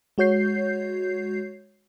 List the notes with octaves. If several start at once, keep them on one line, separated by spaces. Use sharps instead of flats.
G#3 F#4 C#5 G6 C7